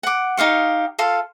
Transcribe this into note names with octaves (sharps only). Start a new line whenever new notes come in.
F#5 D6
D#4 G4 F5 C#6
F4 A4 F5